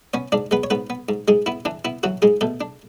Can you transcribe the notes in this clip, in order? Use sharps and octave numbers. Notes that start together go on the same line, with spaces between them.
B3 C#4 C#5
G#2 D4 D5
G#3 B3 B4
C#5
G#2 B3 B4
B3
G#2
G#2 G#3 G#4
B3 E4
E3 D4
B3 E4
E3 F#3 F#4
G#2 G#3 G#4
B2 A3 A4
D4